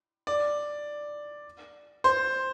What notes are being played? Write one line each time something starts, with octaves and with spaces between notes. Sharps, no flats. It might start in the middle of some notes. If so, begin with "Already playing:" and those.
D5
C5